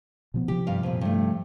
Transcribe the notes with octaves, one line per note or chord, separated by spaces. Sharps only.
B2 F3 B3
C3 F3 G4
G2 F5
F2 A#2
G2 A3